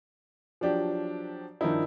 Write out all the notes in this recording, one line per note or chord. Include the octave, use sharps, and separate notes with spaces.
F3 F#3 D4 G4
G2 D#3 F3 D#4 E4